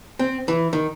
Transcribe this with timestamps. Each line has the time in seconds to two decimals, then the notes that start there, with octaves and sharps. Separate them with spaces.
0.19 C4
0.48 E3
0.73 D#3